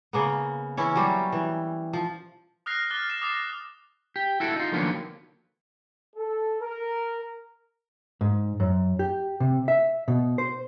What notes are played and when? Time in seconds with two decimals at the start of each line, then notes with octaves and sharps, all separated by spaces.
0.13 C#3 A#3 B3
0.77 E3 C#4 E4 C#5
0.96 F#3 G3 G4
1.33 E3
1.93 F3
2.66 D#6 F6 F#6 A#6 C7
2.90 D6 F6 F#6 A6 G7
3.09 F6 C7 E7
3.22 D6 D#6 A6 A#6 C7 E7
4.16 G4
4.40 E4 F#4 A4
4.56 D#4 F4
4.72 D3 D#3 F3 F#3 A#3 B3
6.16 A4
6.61 A#4
8.21 G#2
8.60 F#2
8.99 G4
9.40 C3
9.68 E5
10.08 B2
10.38 C5